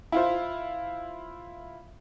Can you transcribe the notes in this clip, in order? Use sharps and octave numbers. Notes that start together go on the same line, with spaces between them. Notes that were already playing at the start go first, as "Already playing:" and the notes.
E4 F4 C5